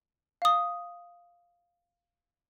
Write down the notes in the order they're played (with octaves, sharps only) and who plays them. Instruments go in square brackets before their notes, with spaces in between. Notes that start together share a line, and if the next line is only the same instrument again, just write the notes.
[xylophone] F5 D#6